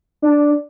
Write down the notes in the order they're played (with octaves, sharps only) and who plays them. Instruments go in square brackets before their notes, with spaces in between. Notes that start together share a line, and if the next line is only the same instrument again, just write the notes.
[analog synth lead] D4